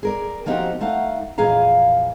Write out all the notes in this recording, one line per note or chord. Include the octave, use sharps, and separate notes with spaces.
G#4 A#4 D5
F3 A#3 C4 D#4 F#4 G4
A3 D#4 F5 F#5
F2 A#2 E3 G#4 F5 A#5